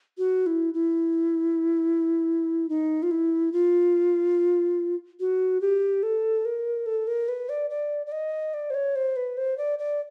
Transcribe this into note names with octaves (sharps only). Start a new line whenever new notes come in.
F#4
E4
E4
D#4
F4
E4
F4
F#4
G4
A4
A#4
A4
A#4
B4
D5
D5
D5
D#5
D5
C5
C#5
C5
B4
C5
D5
D5